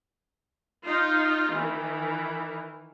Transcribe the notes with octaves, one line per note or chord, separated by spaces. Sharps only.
D#4 F4
D#3 E3